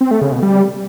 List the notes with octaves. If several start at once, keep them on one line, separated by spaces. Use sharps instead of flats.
C4
A3
C#3
B2
G3